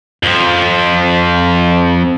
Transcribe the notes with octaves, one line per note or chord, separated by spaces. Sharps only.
F2 F3